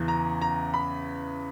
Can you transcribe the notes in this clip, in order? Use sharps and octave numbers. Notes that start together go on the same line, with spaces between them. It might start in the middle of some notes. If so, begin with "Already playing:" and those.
Already playing: E2 C#3 E3
A#5
A#5
B5